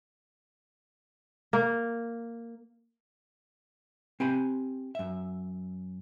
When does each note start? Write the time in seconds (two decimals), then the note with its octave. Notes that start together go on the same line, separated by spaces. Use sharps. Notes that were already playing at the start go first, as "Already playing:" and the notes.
1.53 A#3
4.20 C4 G4 G#5 B5
4.95 F#2 E5